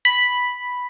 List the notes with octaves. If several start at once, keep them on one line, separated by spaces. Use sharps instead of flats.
B5